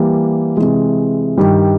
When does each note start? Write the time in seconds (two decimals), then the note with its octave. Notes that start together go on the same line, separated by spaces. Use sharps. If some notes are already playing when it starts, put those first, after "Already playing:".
Already playing: E3 G3 A#3
0.57 C3 E3 G#3
1.37 G2 D#3 G3